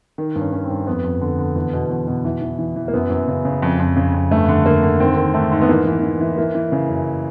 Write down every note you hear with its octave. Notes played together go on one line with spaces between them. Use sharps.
D#3
G2
C#4
D#3 C#4
C4
G2
F2 B3
F2
D3
D3
E2 B3
B2
E2
B2
E3
E3
E3
E3
A#3
F#2 B3
F#2
C#3
C#3
F2
F2
C#3
F2
G2 A3
D3
D3 A#3
D3
D#3 C4
D#3
G#2 A3
G#2
B3
E3 A#3
E3
E3
E3
E3 A#3
E3
C#3
F#2